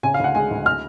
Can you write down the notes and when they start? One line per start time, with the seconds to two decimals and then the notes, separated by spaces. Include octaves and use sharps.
0.03 C#3 G#5
0.14 F5
0.20 D2 F#5
0.35 G#3 G#5
0.51 D2
0.66 F6